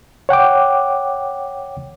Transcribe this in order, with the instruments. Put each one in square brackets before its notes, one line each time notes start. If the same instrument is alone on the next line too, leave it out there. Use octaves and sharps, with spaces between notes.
[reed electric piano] C#5 F#5 G5 D6